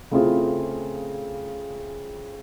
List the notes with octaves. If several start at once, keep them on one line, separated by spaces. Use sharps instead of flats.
C#3 A3 C4 E4 F4 G#4